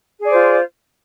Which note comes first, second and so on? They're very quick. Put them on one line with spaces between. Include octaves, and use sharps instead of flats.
G#4 D5 C5 F4